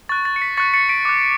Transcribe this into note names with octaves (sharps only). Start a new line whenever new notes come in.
C#6 F#6 A6
A6
C#7
B6
C#6 F#6 A6 C#7
A6 C#7
B6 D7
D6 F#6